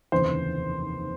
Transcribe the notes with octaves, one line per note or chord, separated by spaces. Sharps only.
F1 D#2 C#3 E3 C5